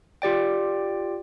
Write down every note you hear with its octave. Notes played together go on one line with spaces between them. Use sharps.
F4 G4 D5 G5